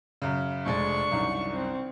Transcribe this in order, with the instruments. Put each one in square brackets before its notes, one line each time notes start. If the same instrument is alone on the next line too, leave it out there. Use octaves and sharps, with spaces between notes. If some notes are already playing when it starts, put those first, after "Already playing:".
[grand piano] F#2 C#3
[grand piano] F1 G#3 A6 [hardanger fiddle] D4 C#6
[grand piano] C2 F#2 D#3
[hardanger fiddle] C4